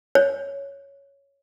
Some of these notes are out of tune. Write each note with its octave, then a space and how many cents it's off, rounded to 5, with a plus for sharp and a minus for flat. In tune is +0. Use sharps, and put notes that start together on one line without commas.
C#5 +5